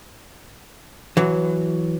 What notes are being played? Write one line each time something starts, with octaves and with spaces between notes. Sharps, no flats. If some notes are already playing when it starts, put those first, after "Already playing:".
E3 F#3